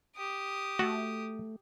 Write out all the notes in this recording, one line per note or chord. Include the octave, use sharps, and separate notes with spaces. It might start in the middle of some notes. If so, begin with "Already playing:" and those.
G4 D#6
A3 F#4